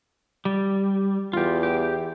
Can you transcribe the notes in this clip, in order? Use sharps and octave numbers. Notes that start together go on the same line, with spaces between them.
G3
E2 F4 G4
G4